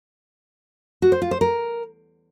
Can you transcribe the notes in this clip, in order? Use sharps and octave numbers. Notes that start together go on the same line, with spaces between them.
F#4
C5
F4
C5
A#4